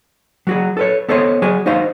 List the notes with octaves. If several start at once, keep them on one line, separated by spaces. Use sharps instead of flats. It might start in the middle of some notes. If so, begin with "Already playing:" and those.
F#3 F#4 G#4
A4 B4 C#5
B3 A4 C5 C#5 D#5
F#3 G#4 G#5
D#4 F#4 C5 D#5 F5